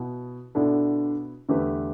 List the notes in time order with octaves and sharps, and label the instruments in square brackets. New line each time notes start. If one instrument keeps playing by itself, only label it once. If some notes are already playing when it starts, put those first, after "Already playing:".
Already playing: [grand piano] B2 B3 E4
[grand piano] B2 B3 E4 [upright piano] D3 D4
[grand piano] E2 D3 A3 G4 B4